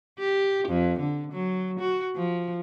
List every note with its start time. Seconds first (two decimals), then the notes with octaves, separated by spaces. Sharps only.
0.19 G4
0.68 F2
0.99 D3
1.32 F#3
1.79 F#4
2.15 F3